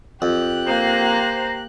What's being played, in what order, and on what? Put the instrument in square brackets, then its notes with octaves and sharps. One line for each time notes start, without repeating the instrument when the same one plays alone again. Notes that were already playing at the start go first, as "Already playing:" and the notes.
[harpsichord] F2 [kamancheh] G4 F#6
[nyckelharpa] A#3 F5 [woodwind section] C5 A#5